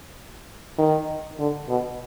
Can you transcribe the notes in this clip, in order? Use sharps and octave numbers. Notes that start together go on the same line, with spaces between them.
D#3
D3
B2